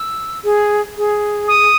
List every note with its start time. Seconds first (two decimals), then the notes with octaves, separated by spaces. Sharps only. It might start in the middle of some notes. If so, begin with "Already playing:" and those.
Already playing: E6
0.44 G#4
0.97 G#4
1.48 D#6